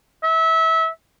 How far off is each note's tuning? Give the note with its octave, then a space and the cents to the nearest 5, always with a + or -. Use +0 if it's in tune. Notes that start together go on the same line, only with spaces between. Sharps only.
E5 -25